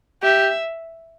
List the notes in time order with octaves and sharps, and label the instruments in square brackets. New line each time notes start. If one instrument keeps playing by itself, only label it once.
[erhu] G4 [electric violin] E5